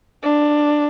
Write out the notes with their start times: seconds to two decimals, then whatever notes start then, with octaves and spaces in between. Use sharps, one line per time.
0.24 D4